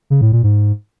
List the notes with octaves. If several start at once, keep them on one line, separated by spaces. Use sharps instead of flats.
C#3
A2
A#2
G#2